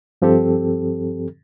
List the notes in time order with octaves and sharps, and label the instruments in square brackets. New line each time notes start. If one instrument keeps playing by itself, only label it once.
[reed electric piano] G2 F3 C4 G4 A4